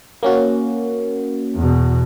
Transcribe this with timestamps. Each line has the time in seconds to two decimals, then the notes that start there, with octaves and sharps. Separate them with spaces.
0.23 A#3 C#4 F#4
1.56 E2 B2